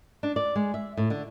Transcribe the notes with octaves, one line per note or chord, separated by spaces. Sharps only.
D4
D5
G#3
E5
A2
D3